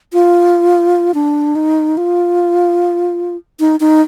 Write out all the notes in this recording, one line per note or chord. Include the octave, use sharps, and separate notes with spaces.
F4
D4
D#4
F4
D#4
D#4